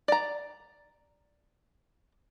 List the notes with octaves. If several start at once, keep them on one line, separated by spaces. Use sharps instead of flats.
D5 A#5